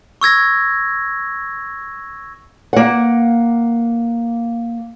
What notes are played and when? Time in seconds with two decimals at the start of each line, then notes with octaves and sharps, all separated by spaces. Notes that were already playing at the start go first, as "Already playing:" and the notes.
0.21 C#6 E6 G#6 A#6
2.73 A#3 F#5